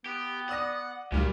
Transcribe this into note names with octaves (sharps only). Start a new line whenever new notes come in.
B3 G4
D5 F#5 D#6 A#6
D2 A#2 F#3 G3 F5